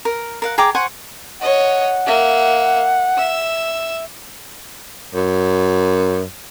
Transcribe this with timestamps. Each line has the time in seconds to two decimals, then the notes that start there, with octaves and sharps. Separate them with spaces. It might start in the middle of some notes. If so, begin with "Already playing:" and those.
0.05 A#4
0.42 A#4 F5 F#5
0.58 G#4 G5 A#5 D6
0.75 C5 F#5 G#5 C#6
1.42 C#5 D#5 F#5
2.07 A#3 E5
3.17 E5 E6
5.14 F#2